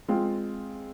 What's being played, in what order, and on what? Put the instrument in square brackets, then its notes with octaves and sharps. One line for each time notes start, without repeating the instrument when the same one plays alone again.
[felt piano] G#3 C4 F4